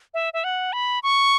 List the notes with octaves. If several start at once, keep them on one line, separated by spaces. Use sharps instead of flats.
E5
E5
F#5
B5
C#6